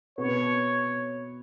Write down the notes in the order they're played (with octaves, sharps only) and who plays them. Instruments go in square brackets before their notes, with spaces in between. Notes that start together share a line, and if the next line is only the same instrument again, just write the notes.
[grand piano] B2 B3 [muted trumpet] C#5